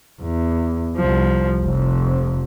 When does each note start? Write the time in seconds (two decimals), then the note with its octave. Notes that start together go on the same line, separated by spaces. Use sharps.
0.21 E2
0.97 C2 F3
1.63 F1 F2